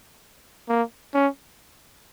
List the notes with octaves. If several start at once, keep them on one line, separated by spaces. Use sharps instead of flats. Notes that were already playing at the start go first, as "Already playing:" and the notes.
A#3
C#4